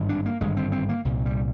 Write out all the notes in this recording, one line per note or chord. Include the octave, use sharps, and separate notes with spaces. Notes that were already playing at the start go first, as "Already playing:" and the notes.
Already playing: G#1 G2 D3
D4
A#3
G#1 G2 D3 G#3
C4
C4
A#3
C2 A#2
G3